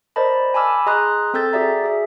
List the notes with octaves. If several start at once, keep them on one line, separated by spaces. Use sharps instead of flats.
A#4 C5 D5 D#5 A5 B5
G#5 A5 B5 D6 E6 F6
G#4 D#5 A#5 C6 D#6 F#6
C4 A4 E6 G6 A6
F#4 G#4 D5 E5 A#5
G#4 E5